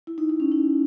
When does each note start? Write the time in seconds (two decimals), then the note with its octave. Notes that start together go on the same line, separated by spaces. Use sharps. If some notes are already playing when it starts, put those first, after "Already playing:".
0.07 E4
0.18 D#4
0.29 D#4
0.40 C#4
0.52 D#4